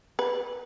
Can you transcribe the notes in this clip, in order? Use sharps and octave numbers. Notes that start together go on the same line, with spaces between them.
B4